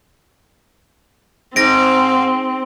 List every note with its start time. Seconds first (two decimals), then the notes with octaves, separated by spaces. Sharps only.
1.56 G#2 C4 A#6 D7